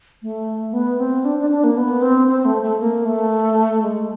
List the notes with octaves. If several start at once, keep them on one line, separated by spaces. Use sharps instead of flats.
A3
B3
C4
D4
D4
D4
A#3
B3
C4
C4
A3
A3
A#3
A3
G#3